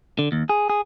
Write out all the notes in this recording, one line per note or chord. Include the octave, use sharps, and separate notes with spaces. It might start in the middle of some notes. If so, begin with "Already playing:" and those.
D3
D#2
G#4
G#4